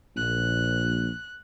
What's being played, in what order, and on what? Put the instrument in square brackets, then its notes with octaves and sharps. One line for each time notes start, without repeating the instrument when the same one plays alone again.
[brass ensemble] A#1 [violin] F#6